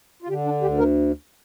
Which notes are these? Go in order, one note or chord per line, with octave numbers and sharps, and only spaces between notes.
F4
D3 G4
D4
D2 G4
A#4